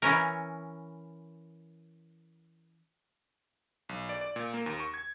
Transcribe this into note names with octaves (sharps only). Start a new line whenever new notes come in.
E3 C#4 A#4
B1
D5
D5
A#2
A#3
D#2
C#6
G#6